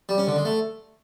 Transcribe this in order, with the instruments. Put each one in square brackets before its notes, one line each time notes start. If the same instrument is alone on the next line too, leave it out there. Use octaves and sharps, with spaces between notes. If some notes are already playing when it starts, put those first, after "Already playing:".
[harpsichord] G3
C#4
D3
G#3
A3